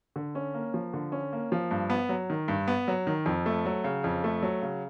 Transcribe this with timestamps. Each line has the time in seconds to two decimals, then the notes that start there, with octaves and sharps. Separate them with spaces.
0.16 D3
0.35 C#4
0.54 A#3
0.74 F3
0.94 D3
1.12 C#4
1.33 A#3
1.52 F3
1.71 G2
1.90 B3
2.09 F#3
2.30 D#3
2.48 G2
2.67 B3
2.88 F#3
3.07 D#3
3.26 F2
3.46 A3
3.65 F#3
3.84 C#3
4.04 F2
4.24 A3
4.43 F#3
4.62 C#3